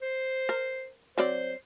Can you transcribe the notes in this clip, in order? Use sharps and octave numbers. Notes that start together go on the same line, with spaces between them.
C5
A#4
F#3 C4 C5 D5